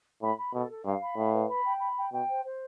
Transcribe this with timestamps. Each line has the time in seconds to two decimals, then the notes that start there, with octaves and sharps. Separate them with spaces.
0.22 A2 B5
0.37 B5
0.53 B2 A4
0.69 A4
0.85 G2 F5
1.01 B5
1.16 A2 F5
1.33 B4
1.49 B5
1.65 G5
1.80 B5
1.97 G5
2.12 B2 G5
2.28 C5
2.44 C5